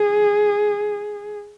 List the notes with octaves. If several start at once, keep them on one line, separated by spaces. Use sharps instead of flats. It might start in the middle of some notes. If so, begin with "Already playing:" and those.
Already playing: G#4